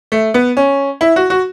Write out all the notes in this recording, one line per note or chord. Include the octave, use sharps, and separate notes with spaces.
A3
B3
C#4
E4
F#4
F#4